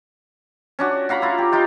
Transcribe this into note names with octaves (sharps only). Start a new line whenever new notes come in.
C#4 D4 F#4
F#4 F5 A#5 B5
E4 F4
G4
D#4 F4 G5